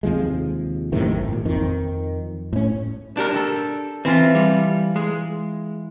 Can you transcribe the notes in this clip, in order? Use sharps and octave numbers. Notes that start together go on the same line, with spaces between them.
D#2 C3 F3 G#3
F#2 A2 C3 D#3
G#1
A#2
F2 D#3
A2 C#4
D4 G4 A#4
A4
E3 C4 F4
G3
G#3